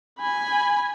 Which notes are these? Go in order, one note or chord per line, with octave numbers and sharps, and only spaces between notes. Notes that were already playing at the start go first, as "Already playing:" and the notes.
G#5 B5